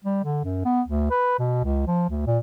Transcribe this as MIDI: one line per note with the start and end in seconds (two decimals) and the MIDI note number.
0.05 0.21 55
0.25 0.44 50
0.44 0.62 42
0.65 0.82 59
0.88 1.10 38
1.11 1.37 71
1.39 1.61 47
1.64 1.85 37
1.87 2.05 53
2.10 2.23 38
2.27 2.38 46